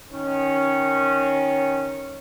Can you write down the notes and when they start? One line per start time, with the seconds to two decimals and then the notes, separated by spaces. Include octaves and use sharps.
0.12 D#3 C#4